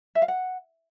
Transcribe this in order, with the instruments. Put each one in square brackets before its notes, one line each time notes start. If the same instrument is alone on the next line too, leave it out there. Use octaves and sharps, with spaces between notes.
[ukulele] E5
F5
F#5